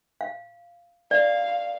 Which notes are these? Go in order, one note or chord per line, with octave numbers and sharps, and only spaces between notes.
F5
D5 F5